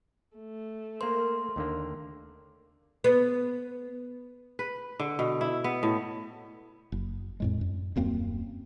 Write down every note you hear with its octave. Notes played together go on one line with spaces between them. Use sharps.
A3
A#3 A#4 C5 C6
D#2 D3 A#3
B3
B4
D3
B2
E4
B3
A2
F#1
F2 A2 G#3
F#2
D#1 F#2 A#3 C4